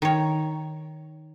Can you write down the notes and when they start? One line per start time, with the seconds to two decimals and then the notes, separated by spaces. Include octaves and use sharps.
0.02 D#3 C#5